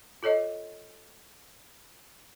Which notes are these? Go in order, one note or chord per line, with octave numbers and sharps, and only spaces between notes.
F4 A4 C#5 D#5